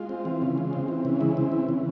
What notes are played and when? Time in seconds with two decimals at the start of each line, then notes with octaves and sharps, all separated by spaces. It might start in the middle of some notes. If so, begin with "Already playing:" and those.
Already playing: G#3 F4
0.09 C4
0.25 E3
0.42 C#3
0.58 G#3
0.73 C4
0.88 E3
1.05 C#3
1.21 G#3 E4
1.37 C4
1.52 E3
1.69 C#3